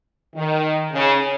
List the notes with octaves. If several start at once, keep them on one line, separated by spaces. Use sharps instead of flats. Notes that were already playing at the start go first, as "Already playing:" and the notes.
D#3
C#3